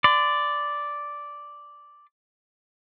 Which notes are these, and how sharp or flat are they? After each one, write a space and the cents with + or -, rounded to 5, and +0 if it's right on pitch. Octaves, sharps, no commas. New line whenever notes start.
D5 -5 C6 -45